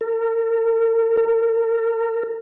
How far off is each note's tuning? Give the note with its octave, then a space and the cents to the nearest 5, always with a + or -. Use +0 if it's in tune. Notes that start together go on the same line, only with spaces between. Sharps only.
A#4 -40
A#4 -35